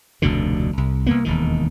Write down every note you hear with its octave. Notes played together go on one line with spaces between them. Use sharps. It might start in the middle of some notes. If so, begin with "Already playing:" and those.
F1 D2 B2 D3
C2
C2 A#3 B3
E1 D#2 D#3